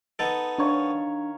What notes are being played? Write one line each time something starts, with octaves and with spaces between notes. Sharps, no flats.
B3 D#4 A4
D#3 D4 C#5 F5